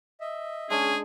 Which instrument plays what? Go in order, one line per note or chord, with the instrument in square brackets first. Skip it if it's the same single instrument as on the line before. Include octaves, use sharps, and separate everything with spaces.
[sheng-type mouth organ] D#5 E5
[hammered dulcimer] G#3 D4 [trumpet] C#4 [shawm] G#4